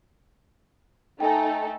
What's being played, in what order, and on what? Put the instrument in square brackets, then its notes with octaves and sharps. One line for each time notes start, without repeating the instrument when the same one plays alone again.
[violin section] A3 D#4 A4 [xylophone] G5 G#5